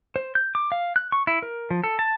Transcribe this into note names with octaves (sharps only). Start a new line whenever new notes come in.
C5
G6
D6
F5
F#6
C#6
E4
A#4
F3
A4
A5